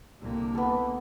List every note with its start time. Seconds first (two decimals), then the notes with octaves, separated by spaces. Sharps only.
0.21 C2 D3 A#3
0.55 B3 A4